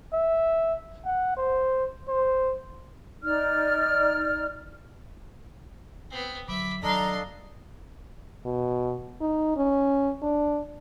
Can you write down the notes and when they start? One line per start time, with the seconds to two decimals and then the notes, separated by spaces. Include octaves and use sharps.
0.13 E5
1.05 F#5
1.37 C5
2.09 C5
3.23 D#4 D5 F6
6.10 B3 C4
6.48 D3 F#3 E5 B5 D6
6.83 D#3 F#3 D4 A4 D#5 F5 A#5 C6
8.45 B2
9.21 D#4
9.56 C#4
10.22 D4